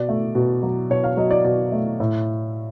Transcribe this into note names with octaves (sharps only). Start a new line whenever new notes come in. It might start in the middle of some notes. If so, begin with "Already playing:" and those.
Already playing: B2 D5
A3
B2
F#3
B2 C#5
F5
F#3 D#5
D5
B2 D5
A3
A2